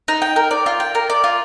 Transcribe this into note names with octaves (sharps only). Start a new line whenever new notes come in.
D#4
G5
A#4
D5
F4
G5
A#4
D5
F4